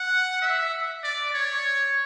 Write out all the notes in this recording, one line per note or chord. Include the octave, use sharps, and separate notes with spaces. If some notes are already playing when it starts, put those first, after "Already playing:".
Already playing: F#5
E5
D5
C#5